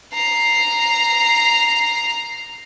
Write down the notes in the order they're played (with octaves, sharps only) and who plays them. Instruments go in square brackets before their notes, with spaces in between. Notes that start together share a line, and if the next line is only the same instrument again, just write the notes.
[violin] A#5 C7